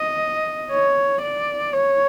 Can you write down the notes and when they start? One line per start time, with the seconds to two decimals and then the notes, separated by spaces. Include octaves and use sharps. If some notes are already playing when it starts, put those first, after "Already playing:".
Already playing: D#5
0.71 C#5
1.22 D5
1.73 C#5